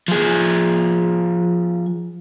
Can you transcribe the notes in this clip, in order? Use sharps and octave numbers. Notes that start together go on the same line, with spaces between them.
F3 G#4